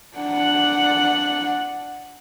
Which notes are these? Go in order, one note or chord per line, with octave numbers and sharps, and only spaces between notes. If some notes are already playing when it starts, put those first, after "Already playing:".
D4 F#5